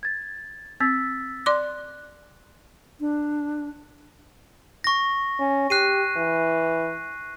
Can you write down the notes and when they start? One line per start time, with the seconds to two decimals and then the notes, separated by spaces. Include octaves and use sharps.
0.03 G#6 A6
0.80 C4 E6 A6 B6
1.46 D5 C6 D6 F#6
3.00 D4
4.84 C#6 A#6
5.39 C#4
5.70 G4 F#6 C7 D#7
6.17 E3